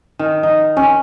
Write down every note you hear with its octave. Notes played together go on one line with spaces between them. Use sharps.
D#3
D#4
C#4